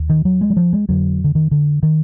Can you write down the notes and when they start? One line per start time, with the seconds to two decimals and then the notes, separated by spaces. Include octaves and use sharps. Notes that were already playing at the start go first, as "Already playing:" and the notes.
Already playing: D#2
0.10 D#3
0.25 F#3
0.41 G#3
0.50 F#3
0.57 F3
0.73 G#3
0.89 F2 D3 F#3
1.24 D3
1.35 D#3
1.51 D3
1.83 D#3